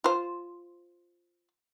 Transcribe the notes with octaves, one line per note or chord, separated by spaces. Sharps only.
F4 C5